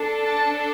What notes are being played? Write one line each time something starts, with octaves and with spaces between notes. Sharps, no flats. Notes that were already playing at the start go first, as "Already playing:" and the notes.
Already playing: D4 A4
A5